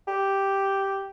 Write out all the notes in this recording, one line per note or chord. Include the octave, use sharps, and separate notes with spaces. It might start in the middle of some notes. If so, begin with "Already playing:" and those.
G4